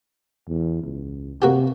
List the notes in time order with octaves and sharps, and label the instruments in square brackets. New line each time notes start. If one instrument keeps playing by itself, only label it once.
[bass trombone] E2
C#2
[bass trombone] C3 [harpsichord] A#3 F#4 G4